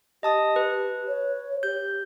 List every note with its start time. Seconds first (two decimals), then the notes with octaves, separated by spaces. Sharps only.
0.23 G4 D#5 A5 D#6
0.56 B4
1.08 C#5
1.63 G4 G6